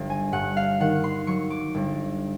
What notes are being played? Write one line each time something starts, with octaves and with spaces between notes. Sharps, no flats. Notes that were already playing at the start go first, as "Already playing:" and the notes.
Already playing: G1 D#3 F#3
G#5
G2 F#5
F5
D#3 F#5
C6
F#3 C#6
D6
G1